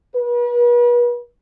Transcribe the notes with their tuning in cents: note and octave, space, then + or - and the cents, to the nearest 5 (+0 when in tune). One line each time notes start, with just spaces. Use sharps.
B4 -40